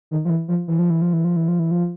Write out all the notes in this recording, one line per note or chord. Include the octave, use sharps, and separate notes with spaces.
D#3
F3
E3
F3
E3
F3
E3
F3
E3
F3
E3
F3
E3
F3